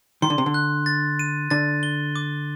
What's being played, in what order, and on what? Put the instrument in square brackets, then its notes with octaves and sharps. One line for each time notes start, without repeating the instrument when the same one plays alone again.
[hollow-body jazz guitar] D#3 [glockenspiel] C6
[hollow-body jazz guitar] D3
C3
D3
[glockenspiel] F#6
A6
D#7
[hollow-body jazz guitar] D3 [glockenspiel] A6
[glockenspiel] G7
D6